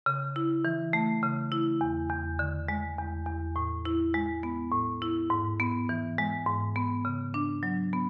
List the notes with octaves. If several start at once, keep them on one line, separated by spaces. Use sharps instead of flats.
C#3
E4
E3
A3
C#3
E4
E2
E2
D3
G#3
E2
E2
A2
E4
G#3
B3
A2
E4
G#2
B3
E3
G#3
G#2
B3
C#3
D4
F#3
B3